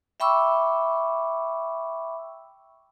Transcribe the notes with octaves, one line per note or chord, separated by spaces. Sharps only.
E5 G5 B5 C#6 D6 E6